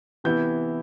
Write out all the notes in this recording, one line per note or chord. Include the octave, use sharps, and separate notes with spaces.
C3 E3 B3 E4 G6